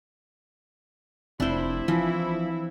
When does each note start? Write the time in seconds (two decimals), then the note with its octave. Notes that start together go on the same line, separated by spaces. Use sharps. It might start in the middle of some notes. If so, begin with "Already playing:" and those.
1.40 F1 C4 D4 E4 C5
1.88 E3 F3